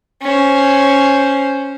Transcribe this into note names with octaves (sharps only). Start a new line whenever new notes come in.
C#4 C5